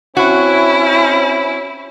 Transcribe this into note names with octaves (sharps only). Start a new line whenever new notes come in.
C4 C#4 E4 F#4